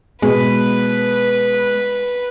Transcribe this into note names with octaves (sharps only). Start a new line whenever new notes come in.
B2 G#3 B4